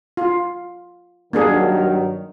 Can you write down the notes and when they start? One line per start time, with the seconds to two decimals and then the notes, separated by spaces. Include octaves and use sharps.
0.17 F4
1.33 G2 D#3 F#3 A#3 D4 G#4